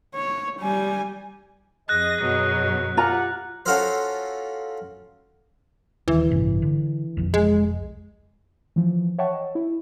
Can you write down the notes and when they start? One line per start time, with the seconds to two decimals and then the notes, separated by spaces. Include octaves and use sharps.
0.15 C#5
0.60 G3 G#5
1.89 F2 G#4 D#5 F#6 A#6
2.21 F#2 B2 F#3
2.97 F4 G4 F#5 A#5
3.66 C#4 F4 F#4 A4 A#4 C5
6.08 D#1 D#3 E3
6.30 A1 G2 C3
6.62 D3
7.17 F1 B1 F2
7.34 G#3
8.76 E3 F3
9.18 C#5 E5 F#5 G5 A5 C#6
9.34 D#5
9.55 E4